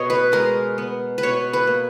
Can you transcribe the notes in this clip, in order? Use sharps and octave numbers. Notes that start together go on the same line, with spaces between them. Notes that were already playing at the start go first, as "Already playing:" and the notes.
Already playing: B2 C#5 D#5
B4
G#3 A#4
B3
B4
B2 C#5
B4
A#3